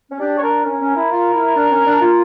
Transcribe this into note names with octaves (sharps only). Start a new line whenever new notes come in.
C#4
D4 G4
C#5
D4 A#4
C#4 A#4
C#4
E4
F4
E4
D4
C#4
D4
F4